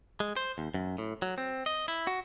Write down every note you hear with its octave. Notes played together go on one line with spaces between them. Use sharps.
G#3
C5
D#2
F#2
A2
F#3
C4
D#5
E4
F#4